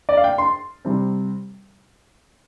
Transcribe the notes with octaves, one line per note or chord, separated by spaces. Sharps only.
D5
F5
G5
C6
C3 G3 C4